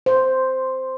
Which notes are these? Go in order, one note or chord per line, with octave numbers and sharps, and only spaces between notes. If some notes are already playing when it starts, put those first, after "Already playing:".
C5